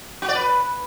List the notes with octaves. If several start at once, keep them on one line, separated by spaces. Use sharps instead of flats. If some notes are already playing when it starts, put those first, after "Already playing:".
F#4
D5
B4